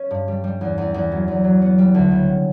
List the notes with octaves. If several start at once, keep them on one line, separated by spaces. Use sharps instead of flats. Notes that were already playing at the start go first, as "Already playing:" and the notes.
Already playing: C#4
G2
G3
G3
E2
E2
E2
F#3
E2
F#3
B3
G3
D2
C#3